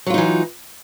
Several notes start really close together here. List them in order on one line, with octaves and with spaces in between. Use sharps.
F#3 F4 D#4 E3